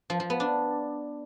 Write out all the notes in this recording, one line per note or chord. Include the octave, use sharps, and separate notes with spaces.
F3
F3
B3
D4